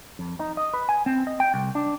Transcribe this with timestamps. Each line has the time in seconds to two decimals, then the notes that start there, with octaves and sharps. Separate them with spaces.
0.19 F2
0.40 D#4
0.57 D#5
0.74 B4
0.89 G#5
1.06 C4
1.27 D#5
1.40 G5
1.54 C2
1.75 D4